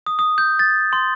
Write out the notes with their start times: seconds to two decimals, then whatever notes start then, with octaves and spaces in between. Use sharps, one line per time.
0.06 D#6
0.19 D#6
0.38 G6
0.59 A6
0.93 C6